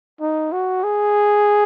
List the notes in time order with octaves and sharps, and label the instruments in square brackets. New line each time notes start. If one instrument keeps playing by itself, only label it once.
[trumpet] D#4
F#4
G#4